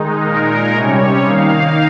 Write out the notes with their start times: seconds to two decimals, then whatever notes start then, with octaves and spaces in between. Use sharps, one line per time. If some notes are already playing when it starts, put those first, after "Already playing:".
Already playing: D#3 G#3 D#4
0.25 A#2 G#3 D#4 A#4
0.75 C3 G3 C#4 C#5
1.27 D#3 A#3 D#4 F5